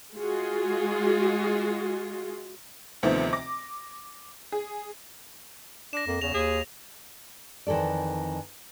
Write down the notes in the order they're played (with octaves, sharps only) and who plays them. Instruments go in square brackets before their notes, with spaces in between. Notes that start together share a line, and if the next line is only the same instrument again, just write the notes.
[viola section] G#3 F4 F#4 G#4
[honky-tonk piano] D2 C3 D#3 F3 A3 B3
D6 A#6
G#4
[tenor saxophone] D4 [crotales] A#6 E7
[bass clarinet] F2 [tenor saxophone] A#3
[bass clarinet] E2 [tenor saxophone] C#3 [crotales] F7
[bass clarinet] D#2 [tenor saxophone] G#4
[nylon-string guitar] F2 D#3 E3 A4 D5